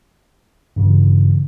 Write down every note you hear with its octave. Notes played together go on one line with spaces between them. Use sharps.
G2 C#3 E3